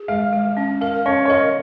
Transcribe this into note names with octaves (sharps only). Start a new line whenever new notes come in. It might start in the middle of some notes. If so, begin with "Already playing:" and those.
Already playing: G#4
G#3 F5
G#3
C#4
A#4 F5
C#4 C#5
C#5
A#4 D#5